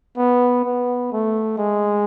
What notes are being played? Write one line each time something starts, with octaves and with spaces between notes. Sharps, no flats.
B3
B3
A3
G#3